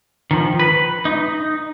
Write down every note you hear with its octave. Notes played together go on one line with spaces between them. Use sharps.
D#3 F3
B4
D#4